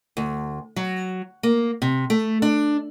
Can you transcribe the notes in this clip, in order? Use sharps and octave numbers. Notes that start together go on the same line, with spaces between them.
D2
F#3
A#3
C3
A3
D4